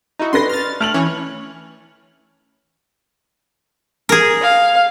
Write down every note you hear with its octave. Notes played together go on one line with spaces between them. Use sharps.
D#4 E4 F#4
D4 B4 C6 A#6
F6 A6
A3 F6 F7 F#7
E3 C#4 C#5
G#4 A#4
F5